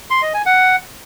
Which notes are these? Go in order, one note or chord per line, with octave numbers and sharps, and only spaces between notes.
C6
D#5
G#5
F#5